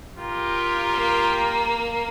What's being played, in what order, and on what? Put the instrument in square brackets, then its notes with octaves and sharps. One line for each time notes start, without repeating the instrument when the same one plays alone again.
[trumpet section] F4 G4 A#4
[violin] A#3